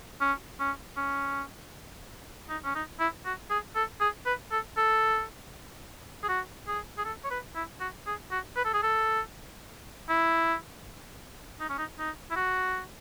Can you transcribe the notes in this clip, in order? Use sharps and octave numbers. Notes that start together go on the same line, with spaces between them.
C#4
C#4
C#4
D#4
C#4
D#4
E4
F#4
G#4
A4
G#4
B4
A4
A4
G#4
F#4
G#4
G#4
A4
C#5
B4
E4
F#4
G#4
F#4
B4
A4
G#4
A4
E4
D#4
C#4
D#4
D#4
E4
F#4